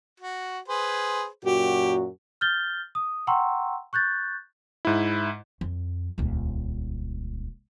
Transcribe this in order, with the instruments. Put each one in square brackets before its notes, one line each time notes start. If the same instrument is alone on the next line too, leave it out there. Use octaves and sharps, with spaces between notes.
[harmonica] F#4
G#4 B4 C5
[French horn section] F#2 A#2 F#4 [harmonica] G4
[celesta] F6 G6 A6 G7
D#6
F#5 G5 A#5 C6 C#6 E6
C#6 F#6 G6 A6
[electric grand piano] G#2 E4
[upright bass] F2
D#1 C#2